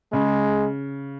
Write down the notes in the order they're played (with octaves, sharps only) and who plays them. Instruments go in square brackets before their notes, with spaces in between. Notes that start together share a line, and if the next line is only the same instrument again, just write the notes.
[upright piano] C#3 [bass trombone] G#3